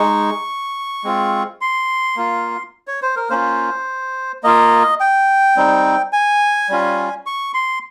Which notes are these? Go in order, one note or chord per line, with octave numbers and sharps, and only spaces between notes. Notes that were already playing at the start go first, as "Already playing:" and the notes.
Already playing: G#3 D#4 C#6
G#3 C4 F4
C6
A#3 F4
C#5
C5
A#4
A#3 C#4 F4 C5
A#3 F4 D#5
G5
G3 C4 D#4
G#5
G3 C#4 F4
C#6
C6